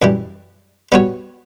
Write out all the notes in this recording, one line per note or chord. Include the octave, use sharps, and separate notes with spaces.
F#2 E3 G3
G3 B3 F#4 C#5